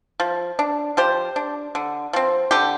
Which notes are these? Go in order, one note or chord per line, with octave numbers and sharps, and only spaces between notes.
F3
D4
F3 G4 C5
D4
D3
F3 C4
D3 G4